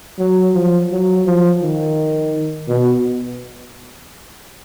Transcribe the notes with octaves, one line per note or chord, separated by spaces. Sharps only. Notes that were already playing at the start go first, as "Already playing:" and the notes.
F#3
F3
F#3
F3
D#3
B2